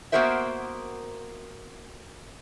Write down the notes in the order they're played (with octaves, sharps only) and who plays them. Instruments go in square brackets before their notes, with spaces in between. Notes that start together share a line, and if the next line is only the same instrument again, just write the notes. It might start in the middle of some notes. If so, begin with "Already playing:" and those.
[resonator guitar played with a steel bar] A#3 B3 F#4 A#4 C5 E5